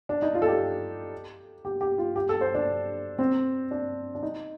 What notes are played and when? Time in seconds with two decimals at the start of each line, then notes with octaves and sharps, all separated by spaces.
0.09 D4
0.22 D#4
0.34 F4
0.42 A4
0.48 G4
1.65 G4
1.81 G4
1.98 F4
2.16 G4
2.29 A4
2.41 C5
2.54 D4
3.19 C4
3.71 D4
4.15 D4
4.23 D#4